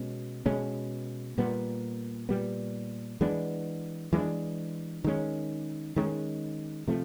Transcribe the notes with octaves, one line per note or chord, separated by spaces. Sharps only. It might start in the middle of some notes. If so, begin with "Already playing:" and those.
Already playing: B2 G#3 C#4
B2 G#3 C#4
A#2 G3 B3
A#2 G3 B3
E3 G#3 B3 D4
E3 G#3 B3 D4
D#3 G#3 C#4
D#3 G#3 C#4
C3 F3 A3